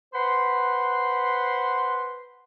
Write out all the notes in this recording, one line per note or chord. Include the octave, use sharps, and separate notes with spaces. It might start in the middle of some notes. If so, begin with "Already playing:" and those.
B4 C5 F#5 B5 C6